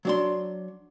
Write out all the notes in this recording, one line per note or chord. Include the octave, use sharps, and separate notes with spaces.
F#3 D4 C6